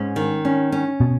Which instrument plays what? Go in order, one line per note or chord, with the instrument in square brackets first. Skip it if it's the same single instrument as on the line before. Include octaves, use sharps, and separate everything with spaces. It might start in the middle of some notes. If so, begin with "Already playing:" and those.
Already playing: [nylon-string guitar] G#2 C#4
D#3
C#4
C#4
[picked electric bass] B2